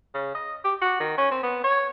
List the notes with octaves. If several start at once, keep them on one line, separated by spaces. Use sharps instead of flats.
C#3
D#5
G4
F#4
D#3
C#4
C4
B3
C#5